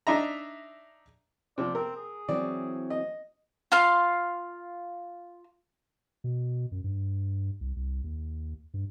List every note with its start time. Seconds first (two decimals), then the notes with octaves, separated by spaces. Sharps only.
0.07 D4 D#4 E5 A#5
1.58 C3 F3 D5
1.75 C4 A#4
1.96 G#4
2.29 E3 F#3 C4 D5
2.90 D#5
3.72 F4 F5 C6
6.24 B2
6.72 F#2
6.84 G2
7.61 C2
7.76 C2
8.04 D#2
8.74 G2